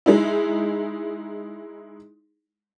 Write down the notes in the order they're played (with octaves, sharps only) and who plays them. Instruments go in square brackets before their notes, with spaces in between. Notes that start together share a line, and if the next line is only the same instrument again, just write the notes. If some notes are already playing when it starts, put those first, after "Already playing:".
[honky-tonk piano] G#3 D#4 E4